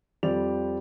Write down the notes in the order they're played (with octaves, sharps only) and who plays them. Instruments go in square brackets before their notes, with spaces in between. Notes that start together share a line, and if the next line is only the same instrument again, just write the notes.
[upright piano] F2 F3 G3 C4 D5 F7